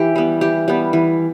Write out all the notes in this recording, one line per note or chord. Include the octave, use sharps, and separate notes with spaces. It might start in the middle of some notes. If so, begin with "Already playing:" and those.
Already playing: E3 G4
G3 B3
E3 G4
G3 B3
E3